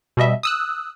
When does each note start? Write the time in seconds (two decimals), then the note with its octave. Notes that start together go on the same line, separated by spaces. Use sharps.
0.17 B2 G3 D#5 E5
0.43 D#6 E6 F#6